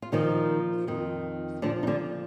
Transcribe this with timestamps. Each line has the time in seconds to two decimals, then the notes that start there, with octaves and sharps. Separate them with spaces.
0.02 F4
0.12 A#2 D#3 F3 D#4
0.87 F2 D#3
1.62 A#2 D3 F3 D4
1.83 D#4
1.87 D3 D4